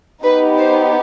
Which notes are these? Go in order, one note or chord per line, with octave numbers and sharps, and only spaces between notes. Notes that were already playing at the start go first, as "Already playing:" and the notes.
B3 D#4 G4 B4
C5